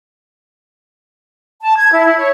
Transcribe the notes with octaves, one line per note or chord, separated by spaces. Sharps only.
A5
G#6
E4
E4
C#5